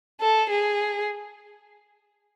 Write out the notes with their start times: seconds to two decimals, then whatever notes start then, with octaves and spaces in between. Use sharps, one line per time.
0.21 A4
0.50 G#4